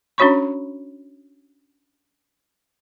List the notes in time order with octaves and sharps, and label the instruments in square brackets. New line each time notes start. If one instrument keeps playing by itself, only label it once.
[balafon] C#4 D4 F#4 C#5 B5 C#6